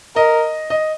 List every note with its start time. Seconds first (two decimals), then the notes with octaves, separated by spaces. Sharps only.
0.16 A#4 D#5
0.70 D#5